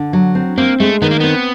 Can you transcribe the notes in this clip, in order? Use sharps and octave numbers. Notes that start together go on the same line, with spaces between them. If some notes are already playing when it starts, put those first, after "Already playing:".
Already playing: D3
F#3
C4
A#3 C4
G#3 A3
D#3 B3
A#3
B3 C4